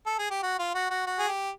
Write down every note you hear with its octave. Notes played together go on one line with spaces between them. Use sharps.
A4
G#4
G4
F#4
F4
F#4
F#4
F#4
G#4
G4